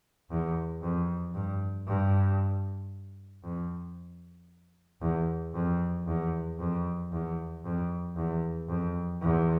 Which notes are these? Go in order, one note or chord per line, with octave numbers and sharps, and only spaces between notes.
E2
F2
G2
G2
F2
E2
F2
E2
F2
E2
F2
E2
F2
E2